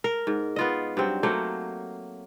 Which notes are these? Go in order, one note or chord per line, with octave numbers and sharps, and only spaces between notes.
A#4
G#2
B3 F4 D#5
G2 F#3 C4
F#3 A3 A#3 C5